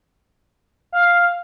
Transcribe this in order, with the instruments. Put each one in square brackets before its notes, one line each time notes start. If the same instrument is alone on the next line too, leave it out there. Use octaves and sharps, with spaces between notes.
[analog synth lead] F5